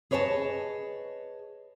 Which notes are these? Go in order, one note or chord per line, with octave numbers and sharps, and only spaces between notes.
G#4 B4 C#5 D#5 G#5 A5